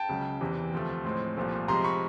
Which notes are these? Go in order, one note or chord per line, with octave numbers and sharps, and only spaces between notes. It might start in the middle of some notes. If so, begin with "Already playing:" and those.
Already playing: G5 A5
C#2 C#3 F#3
E2 C3 E3
D2 C3 F3 A3
A2 F3 G#3 C4
C2 A#2 F3 A3
C3 F3 G#3 A#5 C6
B5 C#6